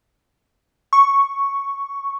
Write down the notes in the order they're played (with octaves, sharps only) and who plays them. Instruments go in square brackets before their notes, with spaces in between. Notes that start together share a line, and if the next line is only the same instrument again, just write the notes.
[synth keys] C#6